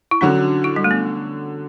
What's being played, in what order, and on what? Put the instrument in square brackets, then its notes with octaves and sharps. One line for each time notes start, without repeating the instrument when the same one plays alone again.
[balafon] E4
[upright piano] D3 F#3 C#4 F#4 [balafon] D4
[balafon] E4
G3
A3
B3